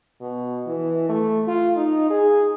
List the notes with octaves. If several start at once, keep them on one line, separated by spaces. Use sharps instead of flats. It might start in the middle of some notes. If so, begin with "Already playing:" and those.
B2
E3
A3
F4
D#4
G#4